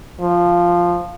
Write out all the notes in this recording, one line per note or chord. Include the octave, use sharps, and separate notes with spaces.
F3